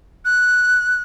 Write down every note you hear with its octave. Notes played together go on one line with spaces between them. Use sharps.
F#6